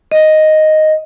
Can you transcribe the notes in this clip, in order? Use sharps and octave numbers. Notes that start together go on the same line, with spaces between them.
D#5